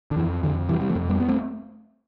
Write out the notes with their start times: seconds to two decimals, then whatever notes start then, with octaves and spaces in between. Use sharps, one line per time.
0.11 D3
0.16 F2 E3
0.43 F2 D3 F3
0.69 C3 E3 G3
0.81 G3
0.89 F3 A3
0.95 F2
1.09 G3 B3
1.20 B3
1.29 A3 C4